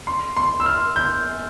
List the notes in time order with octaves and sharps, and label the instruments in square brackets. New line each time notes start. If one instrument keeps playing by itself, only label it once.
[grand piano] C6
C6
E6
F6
G6